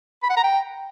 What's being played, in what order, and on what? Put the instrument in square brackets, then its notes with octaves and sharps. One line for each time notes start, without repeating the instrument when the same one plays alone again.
[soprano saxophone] B5
F#5
A#5
G5